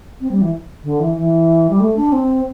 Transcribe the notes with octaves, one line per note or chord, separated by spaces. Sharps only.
C4
G3
E3
D3
E3
E3
G3
A3
D4
C4